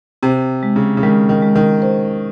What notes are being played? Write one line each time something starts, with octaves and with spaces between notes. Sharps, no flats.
C3 C5
G#3
C#3
C#3
D#3 G#3
D#3
G#3
D#3
C5